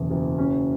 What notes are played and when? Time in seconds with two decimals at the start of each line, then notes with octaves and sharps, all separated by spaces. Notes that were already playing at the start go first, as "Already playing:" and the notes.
Already playing: F#1 E2 B2
0.10 F#1
0.39 C#4